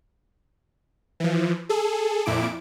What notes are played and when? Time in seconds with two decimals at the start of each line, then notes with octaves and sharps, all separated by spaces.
1.20 E3 F3
1.69 G#4 A4
2.25 F2 A#2 E4 D6 D7